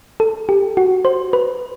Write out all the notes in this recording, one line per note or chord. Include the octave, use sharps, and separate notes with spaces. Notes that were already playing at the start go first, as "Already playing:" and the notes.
A4
G4
F#4
C5
B4